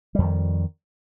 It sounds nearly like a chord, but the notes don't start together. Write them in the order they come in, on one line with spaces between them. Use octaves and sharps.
G3 F2 D#3